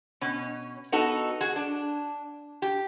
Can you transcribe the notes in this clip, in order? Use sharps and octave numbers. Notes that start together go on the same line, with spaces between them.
B2 C#4
B3 D#4 F#4 A4
F#4 G#4
D4
G4